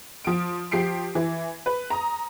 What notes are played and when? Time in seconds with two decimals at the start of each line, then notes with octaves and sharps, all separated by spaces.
0.24 F3 D7
0.71 F3 G4 C7 D7
1.15 E3
1.66 B4
1.90 A#5 D#6